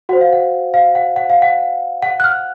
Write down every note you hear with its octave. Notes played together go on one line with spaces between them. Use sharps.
F#4 C5 F#5
F5
F#5
F5
F#5
F#5
F5
F#5
F#5
F#6
F6